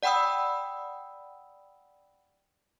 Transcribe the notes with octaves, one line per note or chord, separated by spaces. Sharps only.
D5 F#5 G5 B5 D#6 E6